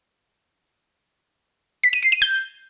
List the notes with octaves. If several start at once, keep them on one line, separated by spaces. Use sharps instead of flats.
B6
D#7
C7
D#7
G6